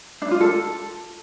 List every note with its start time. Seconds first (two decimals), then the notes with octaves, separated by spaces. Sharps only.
0.22 D4
0.31 F4
0.41 A4